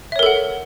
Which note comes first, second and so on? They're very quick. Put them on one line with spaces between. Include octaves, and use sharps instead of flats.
E5 C#5 A#4 A4 F#5